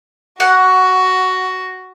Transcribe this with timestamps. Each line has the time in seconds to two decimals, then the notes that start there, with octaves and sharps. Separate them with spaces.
0.40 F#4 F#5